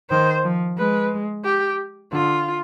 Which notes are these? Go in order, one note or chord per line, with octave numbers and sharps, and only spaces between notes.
D#3 C5
F3
G#3 B4
G4
D3 F4